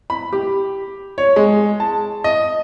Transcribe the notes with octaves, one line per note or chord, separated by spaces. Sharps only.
B5
G4
C#5
G#3
A5
D#5